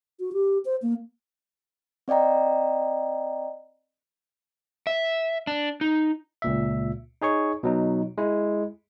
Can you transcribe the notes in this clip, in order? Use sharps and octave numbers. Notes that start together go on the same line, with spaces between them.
F#4
G4
C5
A#3
C4 D5 D#5 G5 A#5
E5
D4
D#4
C#2 A#2 E5
D#4 G#4 C#5 C#6
B2 F#3 D#4
G#3 E4